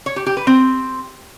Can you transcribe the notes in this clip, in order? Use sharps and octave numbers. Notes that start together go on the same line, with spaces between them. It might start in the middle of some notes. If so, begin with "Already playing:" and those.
C#5
G4
G4
B4
C4